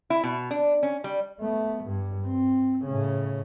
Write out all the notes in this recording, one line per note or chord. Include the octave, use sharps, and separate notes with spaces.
E4
B2
D4
C#4
G3
A3 B3
G2
C4
A2 C#3